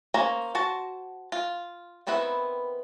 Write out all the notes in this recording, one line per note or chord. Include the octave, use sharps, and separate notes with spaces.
A#3 C#4 C5 G#5 A#5
F#4 C5 A5
F4
D#3 B3 C4 E4 B4